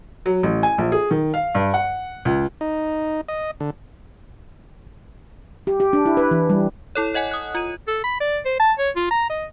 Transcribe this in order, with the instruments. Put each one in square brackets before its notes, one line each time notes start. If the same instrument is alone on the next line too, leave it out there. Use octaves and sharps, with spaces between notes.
[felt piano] F#3
A1
G#5
A#1
G#4
D#3
F5
G2
F#5
C#2
[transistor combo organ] D#4
D#5
D3
[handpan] G4
G4
D4
E4
B4
E3
G3
[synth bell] E4 A4 C#5
C#5 D#5 F#5 G#5
D#6 F#6
F4 D#7
[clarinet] A4
B5
D5
C5
A5
C#5
F4
A#5
D#5